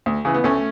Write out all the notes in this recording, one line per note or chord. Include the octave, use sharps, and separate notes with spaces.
D2
C#3 E3
B3
D2 A3 C#4